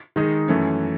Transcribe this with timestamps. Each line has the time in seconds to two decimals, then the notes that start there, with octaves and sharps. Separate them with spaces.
0.16 D#3 G#3 D#4 G#4
0.48 F#2 E3 A3 C#4